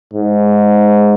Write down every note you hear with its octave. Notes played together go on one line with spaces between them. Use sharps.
G#2